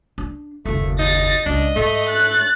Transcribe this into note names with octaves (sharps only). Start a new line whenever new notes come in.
D4
F#1 D#2 A3
D#4 A6 A#6
C#2 G#3 D4 D#5
G#2 A3
F#6 A6